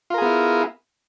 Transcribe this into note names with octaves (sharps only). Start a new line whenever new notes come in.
B3 E4 F4 G#4 A#4